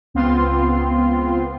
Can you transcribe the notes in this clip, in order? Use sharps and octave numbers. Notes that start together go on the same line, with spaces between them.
C#2 B3 C4 F4 C6